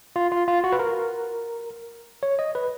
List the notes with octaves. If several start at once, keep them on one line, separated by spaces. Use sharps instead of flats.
F4
F4
F4
F#4
B4
A#4
C#5
D#5
B4